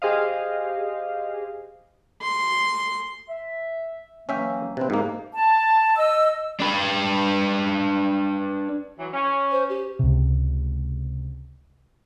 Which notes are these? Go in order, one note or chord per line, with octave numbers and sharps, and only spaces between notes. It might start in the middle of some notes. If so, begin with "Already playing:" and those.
G4 G#4 C5 D#5 F5
C6
E5
E3 F#3 A#3 C#4 E5 G5
C3 C4 D4 E4 B4
G#2 A#3 C4 G4
A5
D#5 E6
D4 B4
E3 F#3
C#4
C5
G4
C#2 C3